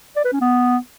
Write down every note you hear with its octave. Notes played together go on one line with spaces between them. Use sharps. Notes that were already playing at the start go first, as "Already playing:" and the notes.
D5
B4
C#4
B3